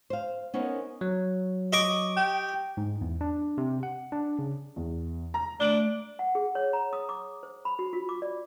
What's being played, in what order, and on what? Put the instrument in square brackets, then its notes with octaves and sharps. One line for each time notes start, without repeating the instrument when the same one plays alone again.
[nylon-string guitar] C5 F5
B3 C#4 D#4 A#4 C5
[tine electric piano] F#3
[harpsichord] D#5 C#6 D6
[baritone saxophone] G4
[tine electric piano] G#2
E2
D4
C3
F#5
D4
C#3
[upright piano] E2
A#5
[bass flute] A3 [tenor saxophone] D4 [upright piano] D7 F#7 G7
[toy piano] F#5
G#4
C#5
A#5
D#6
D6
C5
B5
F#4
F4
D6
D5